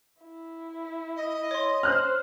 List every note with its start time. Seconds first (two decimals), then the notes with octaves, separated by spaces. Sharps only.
0.22 E4
1.16 D#5
1.51 C#5 C6
1.83 C5 F6 F#6